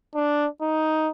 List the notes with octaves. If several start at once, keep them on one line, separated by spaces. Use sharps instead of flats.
D4
D#4